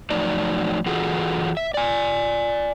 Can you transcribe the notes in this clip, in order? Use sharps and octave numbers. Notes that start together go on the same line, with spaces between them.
F3 F#3 A3 D#4 D5
E3 F4 F#4 G#4 A4
E5
D5 G#5